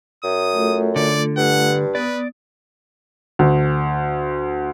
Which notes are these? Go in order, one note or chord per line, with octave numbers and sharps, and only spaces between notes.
F#2 D#6
A3 F4 A4
D3 D5
G2 F#5
B3 B4 D5 D#6
D2